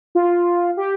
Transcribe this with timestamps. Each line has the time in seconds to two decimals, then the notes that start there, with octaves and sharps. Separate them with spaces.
0.15 F4
0.77 G4